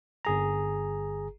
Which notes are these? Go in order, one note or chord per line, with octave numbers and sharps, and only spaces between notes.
G1 G#4 A#5